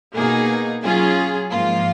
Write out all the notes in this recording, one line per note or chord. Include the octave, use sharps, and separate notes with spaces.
B2 A#3 D#4 G#4
F#3 C#4 F4 G#4
G#2 F3 A#3 F4